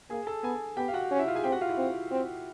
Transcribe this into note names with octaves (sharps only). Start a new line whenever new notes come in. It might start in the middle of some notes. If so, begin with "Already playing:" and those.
A#3 G#4 G#5
A4 A5
B3 G#4 G#5
B3 G4 G5
F5
F#4 F#5
C#4
E4 E5
F4 F5
G#4 G#5
C4 G4 G5
F#4 F#5
F4 F5
E4 E5
C4
C4